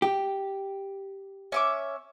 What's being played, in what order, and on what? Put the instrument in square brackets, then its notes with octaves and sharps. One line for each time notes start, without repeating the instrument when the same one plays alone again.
[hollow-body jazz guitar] G4
[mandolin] C#4 E5 D6